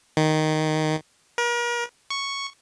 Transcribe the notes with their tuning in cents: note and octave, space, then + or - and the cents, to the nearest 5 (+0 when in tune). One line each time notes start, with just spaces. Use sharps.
D#3 +0
A#4 +40
C#6 +0